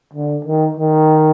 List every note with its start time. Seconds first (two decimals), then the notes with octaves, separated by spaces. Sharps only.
0.13 D3
0.45 D#3
0.77 D#3